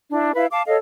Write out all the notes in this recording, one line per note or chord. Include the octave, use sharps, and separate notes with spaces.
D4 E4
E4 B4 F5
F5 A5 D6
A4 C#5 D#5 F5